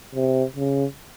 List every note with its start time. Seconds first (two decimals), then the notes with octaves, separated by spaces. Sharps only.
0.15 C3
0.56 C#3